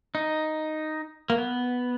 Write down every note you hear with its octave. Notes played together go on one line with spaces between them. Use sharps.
D#4
A#3
B3